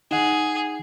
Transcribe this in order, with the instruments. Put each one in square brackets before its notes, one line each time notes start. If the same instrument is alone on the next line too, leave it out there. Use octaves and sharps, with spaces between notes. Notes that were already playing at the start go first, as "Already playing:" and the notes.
[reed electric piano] D#4 F#5 [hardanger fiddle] G#4